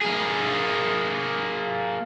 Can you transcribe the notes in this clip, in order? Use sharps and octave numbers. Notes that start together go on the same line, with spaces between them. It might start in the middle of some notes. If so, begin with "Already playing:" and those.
A#3 G#4